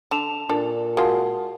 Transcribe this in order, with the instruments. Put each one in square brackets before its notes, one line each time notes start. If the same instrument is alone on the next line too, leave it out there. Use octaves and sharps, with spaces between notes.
[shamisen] D3 [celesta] A5 E7 F7
[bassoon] A#2 [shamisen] D4 A4
[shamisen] G#3 A#3 F4 [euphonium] F#4 [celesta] A#4 F#5 A5